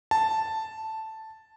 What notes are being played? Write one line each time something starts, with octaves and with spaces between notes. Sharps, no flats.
A5